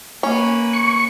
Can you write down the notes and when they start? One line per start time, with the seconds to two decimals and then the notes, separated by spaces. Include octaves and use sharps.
0.23 A#3 C#4 B4
0.73 C#6